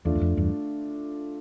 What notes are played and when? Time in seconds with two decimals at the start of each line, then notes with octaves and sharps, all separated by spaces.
0.05 E2 A3 D4 F4
0.15 E2
0.21 F2
0.37 E2 G2